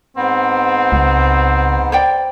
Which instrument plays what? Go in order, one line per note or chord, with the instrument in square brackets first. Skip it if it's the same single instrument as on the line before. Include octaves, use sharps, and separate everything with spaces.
[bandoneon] G#2 B3 [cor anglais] C4
[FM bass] C#2
[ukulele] C5 D5 G5